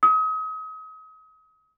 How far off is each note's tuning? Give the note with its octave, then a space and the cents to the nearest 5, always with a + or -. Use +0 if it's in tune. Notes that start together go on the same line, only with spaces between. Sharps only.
D#6 +35